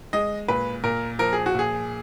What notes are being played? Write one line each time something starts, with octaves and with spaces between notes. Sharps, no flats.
G#3 D#5
A#2 B4
A#2 A#4
F3 A#4
G#4
F#4
A#2 G#4